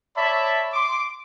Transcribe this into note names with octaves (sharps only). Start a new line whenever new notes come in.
C#5 D5 E5 A5 B5
C6 D6